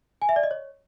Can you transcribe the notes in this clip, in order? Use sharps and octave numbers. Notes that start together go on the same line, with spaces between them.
G#5
E5
D5
D#5
C#5